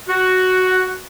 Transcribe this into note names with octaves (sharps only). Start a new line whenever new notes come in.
F#4